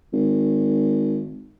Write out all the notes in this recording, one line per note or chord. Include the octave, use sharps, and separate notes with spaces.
G#1